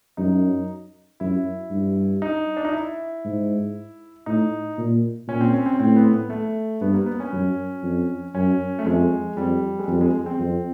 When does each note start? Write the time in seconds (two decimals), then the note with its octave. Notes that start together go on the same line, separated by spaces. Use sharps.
0.17 F#2 D#4
1.20 F#2 E4
1.71 G2
2.22 D#4
2.57 D4
2.65 D#4
2.73 E4
3.25 G#2
4.26 A2 D#4
4.78 A#2
5.28 A#2 C#4
5.41 C4
5.53 C#4
5.66 C4
5.79 A2 C4
5.96 B3
6.14 B3
6.30 A3
6.81 G2 B3
6.94 A#3
7.06 B3
7.20 C#4
7.33 F#2
7.83 F2
8.35 F#2 C#4
8.79 A3
8.86 F2 G#3
9.36 F2 G3
9.79 G#3
9.87 F2 G3
10.01 G#3
10.14 G#3
10.26 C4
10.39 F2